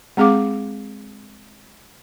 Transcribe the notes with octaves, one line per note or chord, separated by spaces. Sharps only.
G#3 C4 G#4 F5 D6